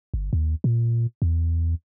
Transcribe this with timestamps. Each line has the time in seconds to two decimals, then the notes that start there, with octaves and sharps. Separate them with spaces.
0.14 G1
0.33 D#2
0.64 A#2
1.22 E2